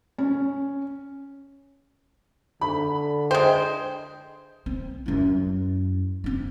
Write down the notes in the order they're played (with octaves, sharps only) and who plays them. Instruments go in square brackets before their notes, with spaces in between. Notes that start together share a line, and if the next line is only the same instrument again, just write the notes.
[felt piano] C#4
[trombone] D3 [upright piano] B5
[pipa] G#3 C5 [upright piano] G5
[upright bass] C4
F#2 E4
C4 D4